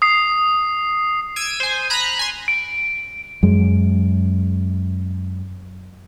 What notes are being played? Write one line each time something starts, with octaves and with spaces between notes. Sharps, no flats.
D#6 C7
E6 G#6 D7 D#7
C5 G#5
A#5 B5 F#6
G#5 C6
D7
F#2 G#3